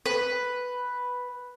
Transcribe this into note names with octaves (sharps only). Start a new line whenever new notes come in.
B4